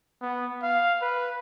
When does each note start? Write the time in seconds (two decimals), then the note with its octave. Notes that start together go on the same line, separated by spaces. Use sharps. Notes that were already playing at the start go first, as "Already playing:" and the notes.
0.22 B3
0.63 F5
1.02 B4